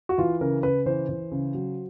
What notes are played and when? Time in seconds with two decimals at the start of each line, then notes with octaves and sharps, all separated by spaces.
0.09 F#4
0.18 E3 F4
0.41 C#3 A#4
0.63 C#3 B4
0.86 E3 C5
1.09 E3
1.32 C#3
1.54 F#3